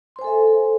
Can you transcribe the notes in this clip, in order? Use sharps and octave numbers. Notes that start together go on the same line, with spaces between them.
A4 C5 E5 G#5 C6